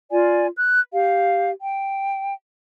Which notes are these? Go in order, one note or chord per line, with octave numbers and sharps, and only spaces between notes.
F4 D5 G#5
F#6
G4 F5
G5